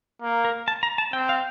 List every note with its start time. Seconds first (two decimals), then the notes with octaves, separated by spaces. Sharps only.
0.22 A#3
0.45 A#4
0.68 A5
0.83 A#5
0.98 A5
1.13 C4 G5
1.29 F5